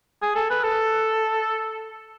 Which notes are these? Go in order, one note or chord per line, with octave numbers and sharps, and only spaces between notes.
G#4
A4
B4
A4